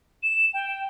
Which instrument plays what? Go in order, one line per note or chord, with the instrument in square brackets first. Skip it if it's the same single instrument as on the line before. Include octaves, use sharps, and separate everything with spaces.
[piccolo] E7
G5